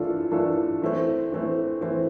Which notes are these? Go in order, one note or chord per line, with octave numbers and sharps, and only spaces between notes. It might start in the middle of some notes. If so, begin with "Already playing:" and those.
Already playing: E3 A3 D4 F4 A4
E3 A3 D4 F4 A4
E3 A3 C4
E3 A3 C4
E3 A3 C4